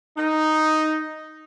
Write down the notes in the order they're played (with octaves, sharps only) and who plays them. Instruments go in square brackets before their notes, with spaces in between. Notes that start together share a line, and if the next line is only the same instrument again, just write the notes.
[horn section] D#4